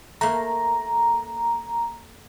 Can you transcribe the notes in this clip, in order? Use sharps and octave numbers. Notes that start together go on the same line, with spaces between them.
A3 A#3 A#5